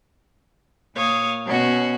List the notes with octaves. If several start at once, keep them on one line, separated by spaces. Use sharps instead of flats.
A#2 C#5 F5 D#6
B2 C#4 F#4